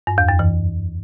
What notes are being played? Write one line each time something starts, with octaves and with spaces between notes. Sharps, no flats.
G2
E2
F#2
E3